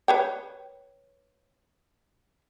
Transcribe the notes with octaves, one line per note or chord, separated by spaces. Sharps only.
B4 C#5 G5